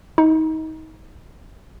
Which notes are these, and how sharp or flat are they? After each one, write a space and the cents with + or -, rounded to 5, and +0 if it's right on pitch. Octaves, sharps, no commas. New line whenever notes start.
D#4 +30